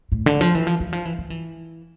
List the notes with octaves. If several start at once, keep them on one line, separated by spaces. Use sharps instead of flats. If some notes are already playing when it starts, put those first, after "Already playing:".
A2
D3
F3
E3
F3
E3
F3
E3
F3
E3